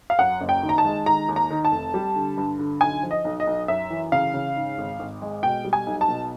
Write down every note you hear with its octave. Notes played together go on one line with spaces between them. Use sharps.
F5
F#2 F#5
F#1
G5
D#3
A#5
A5
G#3
D#3 A#5
D#2
A#5
D#3
A5
F1
G3
D3
G2
D3
B1 G#5
F3
D#5
B1
D#5
B1
F#2 E5
E3
C#3 F5
C#3
G#2
G#1
G#1
G#3
B2 G5
G3
G#5
B1
A5
B2